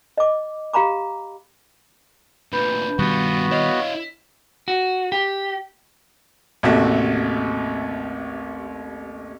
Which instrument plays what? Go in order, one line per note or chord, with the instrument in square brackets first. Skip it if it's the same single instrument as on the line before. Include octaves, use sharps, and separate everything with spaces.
[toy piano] D#5 D6
G4 F5 A#5 B5 D6
[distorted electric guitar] D2 A#2 [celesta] B4 B5 G6
[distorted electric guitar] G2 F4 [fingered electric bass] B2 D#3 G3 [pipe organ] B3 F#4
[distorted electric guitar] E4 F5 [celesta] C#5 D#5
[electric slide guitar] F#4
G4
[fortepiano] A1 D#2 C3 A3 F#4 E5